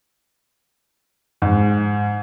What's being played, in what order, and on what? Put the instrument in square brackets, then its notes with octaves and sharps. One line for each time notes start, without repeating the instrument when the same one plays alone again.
[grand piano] G#2